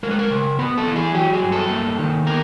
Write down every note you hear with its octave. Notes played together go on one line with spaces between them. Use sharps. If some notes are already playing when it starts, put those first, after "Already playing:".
G#3 A#4
B4
A#4
C#3
B3 B4
A4
E3
G#4
F#3 G4
G#4
G2
A4
A#3
D#3
B3 A#4